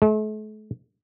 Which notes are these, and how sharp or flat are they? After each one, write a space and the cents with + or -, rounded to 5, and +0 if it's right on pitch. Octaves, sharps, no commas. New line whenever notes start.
A3 -45